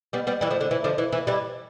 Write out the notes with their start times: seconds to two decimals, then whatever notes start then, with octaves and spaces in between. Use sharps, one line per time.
0.13 G3 B3
0.27 G3 B3
0.41 E3 G3
0.51 F3 A3
0.61 D3
0.71 E3
0.84 D3 F3
0.98 E3
1.12 E3
1.27 E3 G3